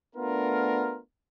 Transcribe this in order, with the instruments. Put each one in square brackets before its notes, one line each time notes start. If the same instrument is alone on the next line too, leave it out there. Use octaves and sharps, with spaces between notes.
[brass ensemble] A3 B3 D4 F4 A#4